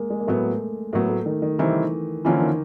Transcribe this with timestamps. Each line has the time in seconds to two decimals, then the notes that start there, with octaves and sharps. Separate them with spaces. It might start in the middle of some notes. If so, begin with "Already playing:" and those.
Already playing: G#3 A#3
0.10 G#3
0.20 A#3
0.27 A2 F#3 A3 B3
0.93 A2 F#3 A#3 B3
1.09 A3
1.26 D#3
1.42 D#3
1.59 C3 D#3 E3 G3 C4 E4
2.25 D3 E3 F3 A#3 C#4 E4
2.41 D#3